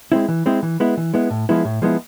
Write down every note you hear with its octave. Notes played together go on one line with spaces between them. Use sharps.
G#3 C4 E4
E3
G#3 C4 E4
E3
G#3 B3 E4
E3
G#3 B3 E4
A2
F3 G#3 B3 E4
A2
F3 G#3 B3 E4